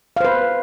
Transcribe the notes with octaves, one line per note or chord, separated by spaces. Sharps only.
B4 C5 F5